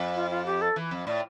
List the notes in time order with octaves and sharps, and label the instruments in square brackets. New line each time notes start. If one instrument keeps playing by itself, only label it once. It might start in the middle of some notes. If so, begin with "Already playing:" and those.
Already playing: [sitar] F2
[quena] F4
F4
G4
A4
[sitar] E3
F2
[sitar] A2 [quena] D5